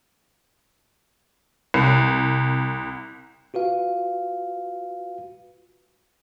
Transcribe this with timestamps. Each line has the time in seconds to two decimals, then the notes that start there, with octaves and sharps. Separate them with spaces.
1.74 C2
3.54 F4 F#4 B4 F5